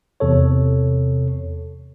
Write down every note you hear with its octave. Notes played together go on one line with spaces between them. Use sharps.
E2 C3 A4 C#5